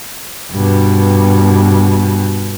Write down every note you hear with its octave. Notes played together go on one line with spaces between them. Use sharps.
G2 B2